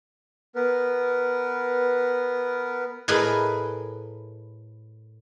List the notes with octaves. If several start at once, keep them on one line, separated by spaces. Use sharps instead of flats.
B3 A#4 B4
A2 G#4 A#4 B4 D#5